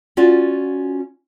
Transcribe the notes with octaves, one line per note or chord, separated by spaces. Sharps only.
C#4 F4 F#4 D5